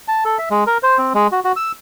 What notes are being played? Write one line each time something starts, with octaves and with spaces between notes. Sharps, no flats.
A5
A4
E5
G#3
A#4
C5
C4
G#3
F#4
F#4
E6